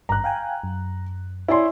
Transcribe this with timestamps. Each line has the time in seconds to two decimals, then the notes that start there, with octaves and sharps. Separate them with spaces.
0.09 G#1 G2 A#5 F#6
0.24 F5 G5 G#5
0.63 F#2
1.48 E4 C#5 D5 G#5 C6